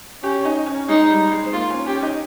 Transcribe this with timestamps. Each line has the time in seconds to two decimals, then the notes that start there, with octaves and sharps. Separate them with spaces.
0.23 C#4 G4
0.45 D#4
0.66 C#4
0.89 G#3 D#4
1.10 G3
1.32 G#3
1.44 C4
1.53 A#3 F4
1.70 C#4
1.86 C#4 G4
2.03 D#4